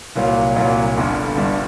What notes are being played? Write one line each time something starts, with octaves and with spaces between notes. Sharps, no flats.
C2 A#2 F#3 A#3
C2 A#2 F#3 A#3
G1 G2 D3 G3
G1 G2 D3 G3